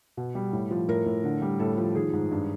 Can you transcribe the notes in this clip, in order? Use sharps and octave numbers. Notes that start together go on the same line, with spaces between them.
B2
G3
A2
F3
A2 A#4
A2
D3
G3
A2 A4
F3
D#3 G#4
G#2
G2